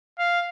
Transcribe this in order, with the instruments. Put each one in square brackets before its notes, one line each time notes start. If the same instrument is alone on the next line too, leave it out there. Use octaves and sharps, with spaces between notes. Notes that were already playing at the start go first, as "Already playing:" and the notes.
[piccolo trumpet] F5